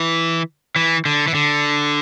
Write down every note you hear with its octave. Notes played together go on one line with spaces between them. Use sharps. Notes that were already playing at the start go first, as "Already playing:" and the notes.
Already playing: E3
E3
D3
E3
D3